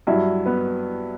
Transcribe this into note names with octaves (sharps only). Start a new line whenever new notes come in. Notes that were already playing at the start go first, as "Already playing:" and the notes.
G2 F#3 E4 E5
B3 B4